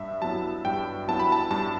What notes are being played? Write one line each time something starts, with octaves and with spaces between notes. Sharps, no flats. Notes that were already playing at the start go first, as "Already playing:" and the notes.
Already playing: G2 E5
F#3 B3 E4 A5
G2 G5
F#3 B3 E4 A5
B5
A5
G2 A5